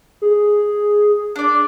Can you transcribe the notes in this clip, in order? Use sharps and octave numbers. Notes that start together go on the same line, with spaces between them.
G#4
D4 D5